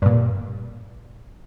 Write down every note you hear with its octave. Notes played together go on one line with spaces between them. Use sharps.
G2 A#2